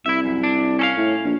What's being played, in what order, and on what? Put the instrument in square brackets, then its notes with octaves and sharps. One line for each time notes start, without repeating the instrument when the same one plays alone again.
[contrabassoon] C2 [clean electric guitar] E4 E5
[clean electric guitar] F#2
D4
C#4 A4 F5
[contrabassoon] A2
A#1